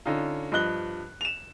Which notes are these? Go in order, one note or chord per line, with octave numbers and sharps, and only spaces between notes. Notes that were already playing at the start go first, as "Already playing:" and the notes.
D3 C#4 D#4 F4
G2 F3 D#5 F#6 G7
E7 F7